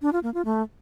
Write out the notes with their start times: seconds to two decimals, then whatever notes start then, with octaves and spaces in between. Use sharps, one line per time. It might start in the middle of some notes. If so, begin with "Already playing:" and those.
0.02 D4
0.13 F4
0.23 A#3
0.34 F4
0.45 A3